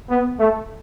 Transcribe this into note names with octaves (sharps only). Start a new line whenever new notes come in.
B3
A3